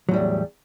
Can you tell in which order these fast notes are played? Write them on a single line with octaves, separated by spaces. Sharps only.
F#3 A2 G3 E2